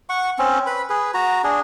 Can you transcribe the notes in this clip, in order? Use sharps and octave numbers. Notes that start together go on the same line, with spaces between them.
F#5 C#6
C4 C#4
B4 B5
G#4 B4
F#4 A#5
D4 G#4